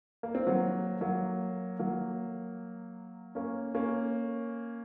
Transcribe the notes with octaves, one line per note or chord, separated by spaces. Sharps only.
A#3
C4
F#3 A#3
F#3 A#3
F#3 A#3
A#3 C#4
A#3 C#4